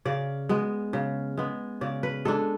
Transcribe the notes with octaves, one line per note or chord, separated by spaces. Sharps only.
C#3 D5
G#3 B3
C#3
G#3 B3
C#3 D5
B4
G#3 D4 A4